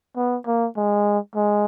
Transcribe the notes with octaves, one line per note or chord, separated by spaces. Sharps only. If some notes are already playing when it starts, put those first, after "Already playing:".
B3
A#3
G#3
G#3